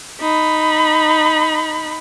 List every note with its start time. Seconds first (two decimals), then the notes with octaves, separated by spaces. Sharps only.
0.21 D#4 B5